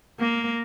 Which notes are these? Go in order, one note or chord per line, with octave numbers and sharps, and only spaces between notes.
A#3